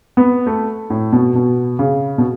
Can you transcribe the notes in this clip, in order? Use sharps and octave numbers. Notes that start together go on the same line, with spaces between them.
B3
A3
A2
B2
B2
C#3
B2